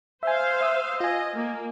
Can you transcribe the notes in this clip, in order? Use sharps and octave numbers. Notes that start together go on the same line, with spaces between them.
C5 E5 F5 G#5
E5 D#6 E6
F4 D#5 G#5
A#3